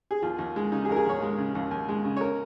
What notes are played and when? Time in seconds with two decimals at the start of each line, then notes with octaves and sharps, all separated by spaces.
0.11 G#4
0.22 D#2 F4
0.38 D#2
0.56 G#3
0.72 C#3 D#4
0.85 G#4
0.89 D#2 A#4
0.96 G#4
1.05 D#2 C#5
1.22 G#3
1.38 C#3
1.55 D#2
1.71 D#2
1.88 G#3
2.04 C#3
2.17 C#5
2.21 A#4